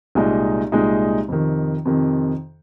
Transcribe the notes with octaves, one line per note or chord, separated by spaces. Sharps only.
C2 A#2 G#3 D#4
C2 A#2 G#3 D#4
F2 C3 D#3
F2 C3 D#3